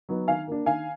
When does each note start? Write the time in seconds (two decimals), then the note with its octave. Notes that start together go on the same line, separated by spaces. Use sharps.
0.09 F#3 B3 D#4
0.28 D#3 F5 G#5
0.47 A#3 D4
0.66 D#3 F5 G#5